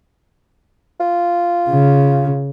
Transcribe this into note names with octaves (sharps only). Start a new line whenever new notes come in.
F4
C#3